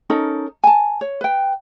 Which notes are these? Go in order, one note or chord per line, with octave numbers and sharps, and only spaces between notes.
C#4 D#4 A4 A#4
G#5 A5
C#5
B4 G5